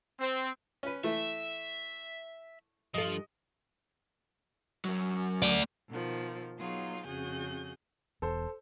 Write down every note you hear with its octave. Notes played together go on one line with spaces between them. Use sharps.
C4
C#4 B4
E3 A3 E5
G2 F3 A4 D#5
F#2 F#3
A3 D5
B2 D#3 F3
F#3 B3 D#4 F4 G#4
F2 C#3 F#4 G#4 G6
E1 E2 A4 C5